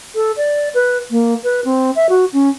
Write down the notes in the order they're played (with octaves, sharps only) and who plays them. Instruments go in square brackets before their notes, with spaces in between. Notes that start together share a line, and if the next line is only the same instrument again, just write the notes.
[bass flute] A4
D5
B4
A#3
B4
C4
E5
F#4
C#4